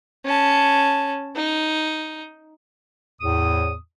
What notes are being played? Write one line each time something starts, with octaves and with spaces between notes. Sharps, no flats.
C#4 A5
D#4
E2 A2 D#6